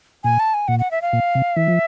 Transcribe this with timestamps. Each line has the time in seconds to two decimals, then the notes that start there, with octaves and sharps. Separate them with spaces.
0.24 A#2 G#5
0.39 A5
0.54 G#5
0.68 A#2 F#5
0.79 F#5
0.91 E5
1.02 F5
1.13 A#2
1.35 C3
1.56 E3 E5
1.68 F3